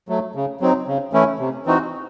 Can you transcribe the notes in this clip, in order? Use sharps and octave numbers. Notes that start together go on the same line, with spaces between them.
F#3 A3
C#3
F#3 C4 D#4
C#3
E3 A3 C#4 E4
C3
E3 C4 D#4 F#4